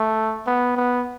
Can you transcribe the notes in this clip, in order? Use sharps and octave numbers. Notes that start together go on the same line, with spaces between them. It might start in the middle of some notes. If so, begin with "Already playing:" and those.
Already playing: A3
B3
B3